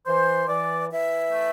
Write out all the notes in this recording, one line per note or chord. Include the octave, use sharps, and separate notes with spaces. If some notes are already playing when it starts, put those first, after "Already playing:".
E3 C5
E3 D5
E3 E5
A3